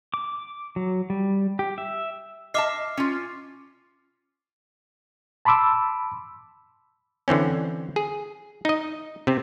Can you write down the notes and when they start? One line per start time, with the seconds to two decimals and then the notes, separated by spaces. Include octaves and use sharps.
0.14 D6
0.76 F#3
1.10 G3
1.59 G4
1.78 E5
2.54 D#5 E5 A5 D6 F6 C7
2.97 C#4 F4
5.45 A5 B5 C6 D6 E6
7.28 D3 E3 C4 C#4
7.96 G#4
8.65 D#4 D#5
9.27 C3 C4